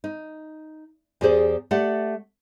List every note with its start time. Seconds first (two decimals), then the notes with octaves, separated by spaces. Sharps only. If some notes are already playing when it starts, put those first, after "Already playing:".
0.04 D#4
1.21 E2 G4 G#4 C5 D5
1.71 A3 G4 D5 F#5